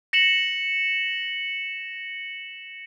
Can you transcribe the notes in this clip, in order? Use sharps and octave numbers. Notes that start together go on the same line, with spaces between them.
A#6 C#7 E7 F#7